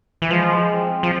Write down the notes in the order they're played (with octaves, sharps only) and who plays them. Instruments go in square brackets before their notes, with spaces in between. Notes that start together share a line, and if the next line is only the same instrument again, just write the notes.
[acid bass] E3
[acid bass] F3 [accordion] G#3
[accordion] C4
[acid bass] F3